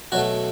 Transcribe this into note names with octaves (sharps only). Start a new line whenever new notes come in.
B2 F#3 A3 F#4